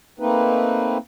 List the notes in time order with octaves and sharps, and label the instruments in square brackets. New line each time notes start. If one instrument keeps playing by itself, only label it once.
[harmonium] A3 A#3 C4 D#4 B4